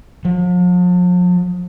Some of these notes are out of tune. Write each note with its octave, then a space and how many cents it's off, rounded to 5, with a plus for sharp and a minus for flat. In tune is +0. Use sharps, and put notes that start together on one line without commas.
F3 +40